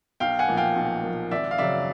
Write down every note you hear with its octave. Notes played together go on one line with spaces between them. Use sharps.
B1 F5 G5
F#5 G#5
A#2 F3
F5 G5
B1
A#2 F3
G#1 D5 E5
F5
F#2 C#3 F#3 D5 E5